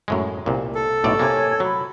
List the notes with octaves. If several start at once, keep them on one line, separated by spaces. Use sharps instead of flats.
F#2 A2 G#3
C2 A#2
A4
B1 A2 D#4 F#4 C#5 D5
C3 A#3 C#5 G#5 G#6
F#3 B5